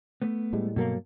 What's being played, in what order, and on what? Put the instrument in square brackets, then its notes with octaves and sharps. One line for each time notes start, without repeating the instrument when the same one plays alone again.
[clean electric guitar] A3 B3
[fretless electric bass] A2 G3 G#3
[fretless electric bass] G2 F#3 A#3 [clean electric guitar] B2 A4